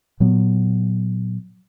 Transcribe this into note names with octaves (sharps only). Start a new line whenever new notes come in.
A#2 F#3 B3